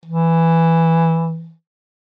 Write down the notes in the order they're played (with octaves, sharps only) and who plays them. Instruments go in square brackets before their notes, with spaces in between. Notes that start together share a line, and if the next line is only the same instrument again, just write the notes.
[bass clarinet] E3